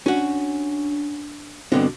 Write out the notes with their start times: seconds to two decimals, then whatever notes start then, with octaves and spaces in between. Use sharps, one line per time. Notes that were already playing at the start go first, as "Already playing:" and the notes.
0.06 C#4 D4 F#4
1.72 G2 B2 D3 C4